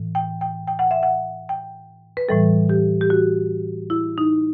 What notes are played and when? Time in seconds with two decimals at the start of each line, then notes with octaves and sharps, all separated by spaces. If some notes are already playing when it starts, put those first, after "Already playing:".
Already playing: A2 E3
0.15 G5
0.41 G5
0.67 G5
0.79 F#5
0.91 E5
1.03 F#5
1.49 G5
2.17 B4
2.29 A2 E3 G3 A4
2.69 G4
3.01 G4
3.10 F#4
3.90 E4
4.18 D#4